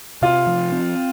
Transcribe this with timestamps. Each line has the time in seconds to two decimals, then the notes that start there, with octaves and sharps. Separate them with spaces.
0.22 C3 F4
0.47 F3
0.72 C4